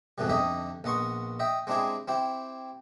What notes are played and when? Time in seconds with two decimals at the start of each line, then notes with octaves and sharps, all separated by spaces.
0.18 F2 G#2 B2 D3 E3 G3
0.29 F2 D3 D#4 G4 D#5 E5
0.84 A#1 B3 D#5 C6 C#6
1.40 D#5 E5 G5
1.67 G#3 C4 D4 E4 G4 G#4
2.08 C4 E4 G4